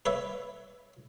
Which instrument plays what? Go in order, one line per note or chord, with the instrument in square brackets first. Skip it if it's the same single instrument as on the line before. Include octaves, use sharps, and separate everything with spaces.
[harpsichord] B4 C#5 E5